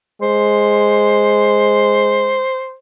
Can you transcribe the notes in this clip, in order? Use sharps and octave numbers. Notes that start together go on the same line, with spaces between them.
G#3 C5